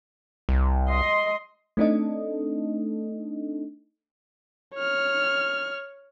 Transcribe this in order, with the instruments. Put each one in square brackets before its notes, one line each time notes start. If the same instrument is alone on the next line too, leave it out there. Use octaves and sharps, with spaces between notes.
[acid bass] C2
[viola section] D#5 C6
[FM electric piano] A3 C4 D4 D#4 A4 D#5
[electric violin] C#5 F6